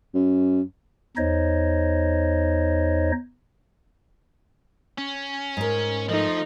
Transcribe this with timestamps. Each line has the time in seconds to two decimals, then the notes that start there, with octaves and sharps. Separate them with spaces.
0.14 F#2
1.17 E2 D#4 C5 C#5 D#5
4.98 C#4
5.57 G#2 A#4
6.09 F3 A3 D#4